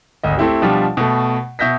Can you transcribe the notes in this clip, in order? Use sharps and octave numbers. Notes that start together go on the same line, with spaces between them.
G#1 D2 D#5
A3 C4 E4 G4
B2 F3 G3 D4 F4 G4
B2 A3
B2 E5 G6 A#6 B6